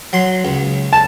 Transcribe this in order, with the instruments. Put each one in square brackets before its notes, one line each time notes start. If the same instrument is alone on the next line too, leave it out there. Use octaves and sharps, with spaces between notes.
[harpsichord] F#3 C6
C#2
[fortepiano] A5